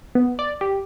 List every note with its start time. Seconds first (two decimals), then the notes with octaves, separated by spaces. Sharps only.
0.15 B3
0.39 D5
0.61 G4